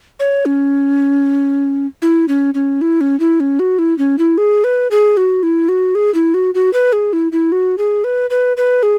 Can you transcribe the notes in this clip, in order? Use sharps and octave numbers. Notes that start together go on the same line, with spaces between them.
C#5
C#4
E4
C#4
C#4
E4
C#4
E4
C#4
F#4
E4
C#4
E4
G#4
B4
G#4
F#4
E4
F#4
G#4
E4
F#4
F#4
B4
G#4
E4
E4
F#4
G#4
B4
B4
B4
G#4